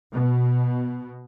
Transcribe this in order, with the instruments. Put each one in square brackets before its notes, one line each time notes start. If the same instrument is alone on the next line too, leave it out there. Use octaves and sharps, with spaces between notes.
[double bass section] B2